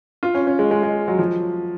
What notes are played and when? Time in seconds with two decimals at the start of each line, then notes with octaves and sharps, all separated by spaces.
0.23 F4
0.35 C#4
0.47 C#4
0.59 G#3
0.71 G#3
0.83 G#3
1.08 F#3
1.19 F3